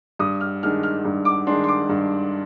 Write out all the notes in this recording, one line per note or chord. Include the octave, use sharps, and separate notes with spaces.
G2 D#6
F6
D#3 G#3 D4 F6
F6
G2
D6
D#3 G#3 D4 C6
C6
D6
G2